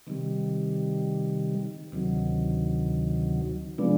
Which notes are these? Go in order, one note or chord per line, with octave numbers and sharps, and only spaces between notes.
C3 D#3 G3
D2 C3 D#3 F#3
C3 F3 G#3 B3 D4